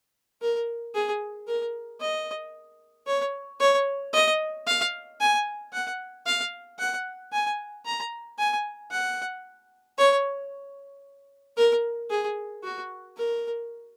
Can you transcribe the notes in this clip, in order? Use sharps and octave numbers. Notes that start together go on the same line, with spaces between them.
A#4
G#4
A#4
D#5
C#5
C#5
D#5
F5
G#5
F#5
F5
F#5
G#5
A#5
G#5
F#5
C#5
A#4
G#4
F#4
A#4